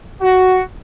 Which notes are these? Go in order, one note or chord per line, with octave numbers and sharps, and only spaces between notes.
F#4